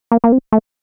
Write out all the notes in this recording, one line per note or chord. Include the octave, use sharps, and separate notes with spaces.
A#3
A#3
C4
A3